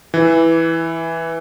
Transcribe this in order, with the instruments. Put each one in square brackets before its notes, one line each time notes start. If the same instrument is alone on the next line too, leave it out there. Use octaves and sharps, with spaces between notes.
[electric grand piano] E3